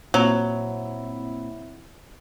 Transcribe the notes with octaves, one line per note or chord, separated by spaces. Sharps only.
A#2 F#3 C4 E4